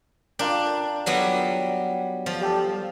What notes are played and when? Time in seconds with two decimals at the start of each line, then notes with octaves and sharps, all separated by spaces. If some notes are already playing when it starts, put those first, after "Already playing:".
0.39 D4 F4 A#4 G5
1.06 F#3 G3 B3
2.26 F3
2.41 G3 G4 A4